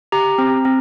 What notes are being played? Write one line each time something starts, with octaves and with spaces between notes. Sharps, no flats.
G4 A#5
C4
C4